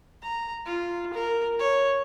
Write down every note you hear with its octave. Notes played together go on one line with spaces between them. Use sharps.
A#5
F4
A#4
C#5